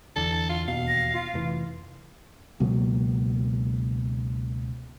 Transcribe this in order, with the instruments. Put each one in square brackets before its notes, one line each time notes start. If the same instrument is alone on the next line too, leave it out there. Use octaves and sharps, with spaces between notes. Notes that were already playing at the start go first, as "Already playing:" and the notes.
[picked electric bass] E2 D3 [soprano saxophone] A4
[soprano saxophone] F4
[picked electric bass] E1 D#2 B2 [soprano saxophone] F5
[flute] A#6
F4
[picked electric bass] F1 A2 E3
[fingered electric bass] C#2 B2 F#3 A#3